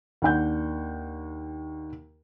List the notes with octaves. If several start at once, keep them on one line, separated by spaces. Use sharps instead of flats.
D#2 D4 F#5 G6